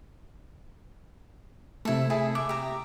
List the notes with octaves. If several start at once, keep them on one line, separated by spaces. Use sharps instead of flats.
C3 A3 E4 A4
E4 G#4 A5
E5 D6
G4 A#5